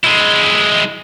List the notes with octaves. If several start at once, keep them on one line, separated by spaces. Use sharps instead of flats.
G#3 E4